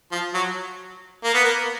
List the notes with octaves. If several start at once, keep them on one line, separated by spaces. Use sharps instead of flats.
F3
F#3
A#3
B3
A#3